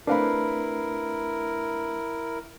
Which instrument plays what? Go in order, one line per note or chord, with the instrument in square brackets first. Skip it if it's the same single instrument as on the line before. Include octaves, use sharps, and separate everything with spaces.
[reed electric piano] A3 C4 D4 [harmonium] E4 A#4 [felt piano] B4 F5 B5